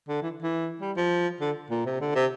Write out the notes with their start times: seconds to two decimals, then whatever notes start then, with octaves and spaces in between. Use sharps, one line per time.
0.08 D3
0.22 E3
0.42 E3
0.81 G3
0.97 F3
1.41 D3
1.70 A#2
1.86 C3
2.01 D3
2.15 C3